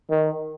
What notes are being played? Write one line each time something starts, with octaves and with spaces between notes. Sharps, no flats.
D#3